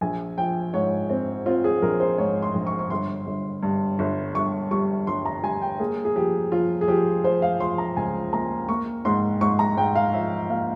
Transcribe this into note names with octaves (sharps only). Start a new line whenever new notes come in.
A#1 G#5
F3 G5
G#2 C#5
C4
C4 F4
G#4
A#1 A#4
C5
G#2 C#5
C6
A#1
C#6
C#6
G1 C6
G1
G2
G1
G1 C#6
G3 C#6
G1 C6
A#5
G3 G#5
G5
A#3 G#4
G#4
F3 G4
F3 F4
G#4
F3 G4
F3 C5
F5
F3 C6
A#5
C#2 G#5
A#3 A#5
A#3 C#6
G#2 C6
G#2 C#6
A#5
G#2 G5
F5
F3 E5
A#3 F5